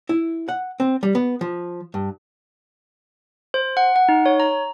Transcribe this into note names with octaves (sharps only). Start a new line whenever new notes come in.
E4
F#5
C4
G3
B3
F3
G2
C5
F#5
F#5
D#4
C#5
A#5